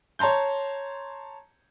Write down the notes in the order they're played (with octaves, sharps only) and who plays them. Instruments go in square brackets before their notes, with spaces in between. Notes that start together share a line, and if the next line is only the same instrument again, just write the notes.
[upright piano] C#5 A5 A#5 C6 G6